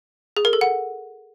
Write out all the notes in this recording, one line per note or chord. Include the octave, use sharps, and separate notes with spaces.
G#4
A#4
A4
F#5